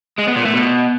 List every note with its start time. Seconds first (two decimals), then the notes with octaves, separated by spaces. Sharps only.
0.18 G#3
0.27 B3
0.36 A#2
0.45 A3
0.54 B2